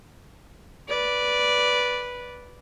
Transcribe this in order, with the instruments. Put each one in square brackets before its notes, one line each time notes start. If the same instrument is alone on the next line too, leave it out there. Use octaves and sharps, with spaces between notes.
[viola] B4 D5